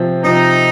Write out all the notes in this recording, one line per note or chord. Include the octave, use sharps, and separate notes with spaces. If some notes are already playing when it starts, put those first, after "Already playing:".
Already playing: C3 F3 C4
C3 F3 C4 D#4